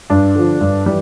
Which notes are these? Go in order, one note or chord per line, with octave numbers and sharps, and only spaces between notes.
G2 D4
D3 F3
G2
E3 G3